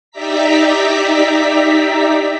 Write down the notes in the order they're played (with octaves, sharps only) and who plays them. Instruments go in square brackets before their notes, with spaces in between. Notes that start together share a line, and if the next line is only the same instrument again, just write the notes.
[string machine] D#4 G4 D5 E5 A#5 B6